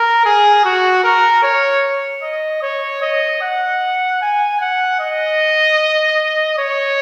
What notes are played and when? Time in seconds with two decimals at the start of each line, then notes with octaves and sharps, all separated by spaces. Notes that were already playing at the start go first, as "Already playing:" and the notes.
Already playing: A#4
0.25 G#4
0.65 F#4
1.04 A#4
1.43 C#5
2.23 D#5
2.62 C#5
3.02 D#5
3.42 F#5
4.22 G#5
4.61 F#5
5.00 D#5
6.59 C#5